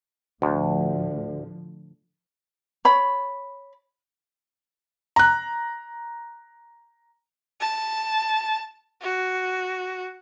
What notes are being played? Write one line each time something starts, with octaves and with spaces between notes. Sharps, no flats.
D2 A2 D3 F3
C#5 B5
A#5 F#6
A5
F#4